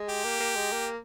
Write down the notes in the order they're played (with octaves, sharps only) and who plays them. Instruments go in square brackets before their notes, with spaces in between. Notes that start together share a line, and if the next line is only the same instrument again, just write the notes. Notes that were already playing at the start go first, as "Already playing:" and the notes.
Already playing: [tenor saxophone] G#3
[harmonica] G4
[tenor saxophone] A#3
A#3
G#3
A#3